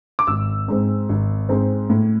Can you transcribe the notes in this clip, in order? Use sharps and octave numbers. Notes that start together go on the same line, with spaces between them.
D6
G#1 E6
G#2 G#3 C4
G#1
G#2 G#3 C4
A2